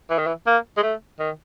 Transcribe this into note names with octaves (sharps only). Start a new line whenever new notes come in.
E3
D#3
E3
A#3
G#3
A3
D#3